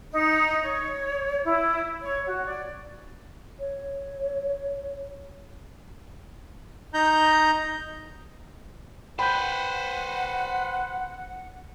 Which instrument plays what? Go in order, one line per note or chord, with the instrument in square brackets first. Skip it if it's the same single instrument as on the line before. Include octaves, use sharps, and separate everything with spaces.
[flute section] D#4
C#5
E4
C#5
F#4
D5
[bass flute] C#5
[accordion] D#4 A#5 G6
[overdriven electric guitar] B4 C5 [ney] F#5 [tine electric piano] G5 G6 [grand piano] B5